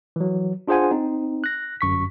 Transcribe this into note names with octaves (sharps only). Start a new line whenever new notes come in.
E3 F#3
D4 F4 G#4 C5 F#5 G#5
C4 D#4
F#6 A#6
G1 F#2 C#6 B6